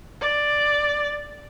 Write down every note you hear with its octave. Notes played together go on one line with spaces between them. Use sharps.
D5